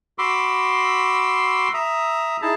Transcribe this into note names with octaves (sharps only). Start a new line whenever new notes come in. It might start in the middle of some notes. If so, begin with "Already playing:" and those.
F#4 B5 C6 D6 E6
E5 A#5 D#6
D#4 E4 G#4 A5